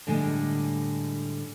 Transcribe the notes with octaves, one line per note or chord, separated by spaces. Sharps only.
A2 D3 G3 G#3